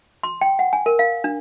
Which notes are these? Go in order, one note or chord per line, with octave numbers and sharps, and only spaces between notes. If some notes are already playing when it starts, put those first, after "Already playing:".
C6
G5
F#5
G#5
A#4
F5
D4